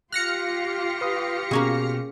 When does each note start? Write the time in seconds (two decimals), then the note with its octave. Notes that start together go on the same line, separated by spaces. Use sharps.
0.12 F4 G4 F6 F#6 A#6 C#7
1.01 B4 D#6
1.51 B2 A#3 C#4 G#4